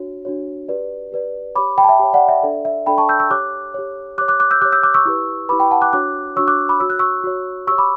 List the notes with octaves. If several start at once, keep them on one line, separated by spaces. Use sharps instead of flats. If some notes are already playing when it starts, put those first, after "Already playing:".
Already playing: D4 F#4 C#5
D4 F#4 C#5
G4 B4 D5
G4 B4 D5
G4 C#5 B5 D6
G5 B5
A5
E5 G5
G4 C#5
D5 F#5
E5
D4 A4 D5 E5
E5
D4 A4 D5 G5 B5
A5 C#6
E6 G6
C#6 E6
G4 C#5 D6 F#6
G4 C#5
G4 C#5 D6 F#6
D6 F#6
D6 F#6
E6 G6
G4 C#5 D6 F#6
E6 G6
D6 F#6
C#6 E6
E4 G4 B4
E4 G4 B4 B5 D6
G5 B5
F#5 A5
D6 F#6
D4 F#4 C#5 D6 F#6
D4 F#4 C#5 C#6 E6
D6 F#6
B5 D6
F#4 C#5 E6
F#6
C#6 E6
F#4 C#5
G4 C#5 C#6 E6
B5 D6